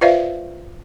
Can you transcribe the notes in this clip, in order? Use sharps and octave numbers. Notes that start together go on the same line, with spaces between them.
F4 B4 C5 D5 E5 F5